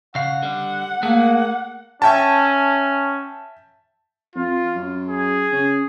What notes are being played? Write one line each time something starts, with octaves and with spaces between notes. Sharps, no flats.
C#3 F5 F#5
D3 G3
A3 A#3 G#4
C#4 E5 G5 A5
F2 F4
F#2
G#4
C#3